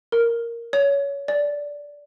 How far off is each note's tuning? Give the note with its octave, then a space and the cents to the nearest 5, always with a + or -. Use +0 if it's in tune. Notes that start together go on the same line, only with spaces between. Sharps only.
A#4 +0
C#5 +20
D5 -10